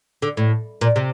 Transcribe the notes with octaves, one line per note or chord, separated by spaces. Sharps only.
D3
A2
A#2
C3